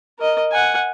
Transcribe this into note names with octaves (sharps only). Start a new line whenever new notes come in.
A#4 D#5
F#5 G#5